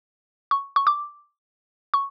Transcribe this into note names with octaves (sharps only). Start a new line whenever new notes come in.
C#6
C#6
D6
C#6